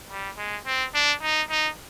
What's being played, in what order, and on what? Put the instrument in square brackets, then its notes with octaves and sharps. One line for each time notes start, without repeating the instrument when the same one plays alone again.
[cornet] G3
G#3
C4
D4
D#4
D#4